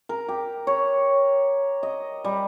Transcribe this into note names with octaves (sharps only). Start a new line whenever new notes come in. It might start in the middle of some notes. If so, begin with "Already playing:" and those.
A#4
G4
C#5
D#5
G3